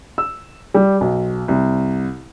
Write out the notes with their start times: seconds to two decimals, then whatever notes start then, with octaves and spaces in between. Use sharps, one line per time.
0.18 E6
0.75 G3
1.01 B1
1.48 C2